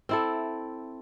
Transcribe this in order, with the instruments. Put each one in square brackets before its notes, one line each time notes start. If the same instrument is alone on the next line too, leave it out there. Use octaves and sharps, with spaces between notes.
[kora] C4 E4 A4